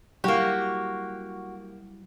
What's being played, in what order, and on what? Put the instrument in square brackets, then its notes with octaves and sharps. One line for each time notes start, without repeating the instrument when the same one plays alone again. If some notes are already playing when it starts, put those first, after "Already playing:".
[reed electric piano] F#3 G3 E4 [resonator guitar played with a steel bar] A#3 G4 [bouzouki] F#4